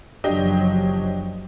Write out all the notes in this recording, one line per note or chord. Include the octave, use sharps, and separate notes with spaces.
F#1 F3 F#3 D4 G4 D#5